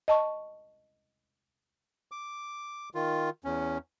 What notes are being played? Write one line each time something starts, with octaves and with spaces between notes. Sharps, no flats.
D#5 A5 C#6
D6
D#3 F4
E2 C#4